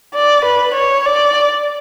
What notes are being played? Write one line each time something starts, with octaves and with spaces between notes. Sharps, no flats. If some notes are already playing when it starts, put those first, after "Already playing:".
D5
B4
C#5
D5